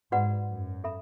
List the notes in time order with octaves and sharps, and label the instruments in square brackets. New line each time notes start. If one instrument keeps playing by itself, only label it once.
[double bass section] G#2 [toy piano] F#4 B4 D5 F#5 B5
[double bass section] F#2
[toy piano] A4 E5 B5